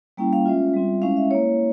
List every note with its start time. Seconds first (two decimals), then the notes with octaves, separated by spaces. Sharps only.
0.17 G3 A#3 C#4 E4 G5
0.33 F5
0.46 G#3 C#4 F4 E5
0.74 G3 C4 F4
1.02 G#3 C#4 E4 F5
1.17 E5
1.30 A#3 E4 C#5